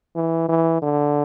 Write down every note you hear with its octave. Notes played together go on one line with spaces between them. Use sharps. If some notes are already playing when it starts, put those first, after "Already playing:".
E3
E3
D3